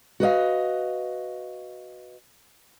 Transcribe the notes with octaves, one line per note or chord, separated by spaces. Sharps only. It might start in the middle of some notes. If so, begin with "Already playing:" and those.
F#4 B4 D#5 F5